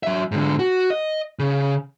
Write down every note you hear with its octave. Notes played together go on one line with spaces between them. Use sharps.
F#3 E5
G#2 D3
F#4
D#5
C#3